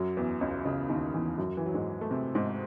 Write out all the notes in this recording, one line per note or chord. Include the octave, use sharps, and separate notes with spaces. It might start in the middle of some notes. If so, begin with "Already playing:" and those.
Already playing: F#2 F#3
E2 E3
C#2 C#3
C#2 C#3
D#2 D#3
E2 E3
F#2 F#3
E3
F#3
G#2 G#3
A3
C3 C4
G#2 G#3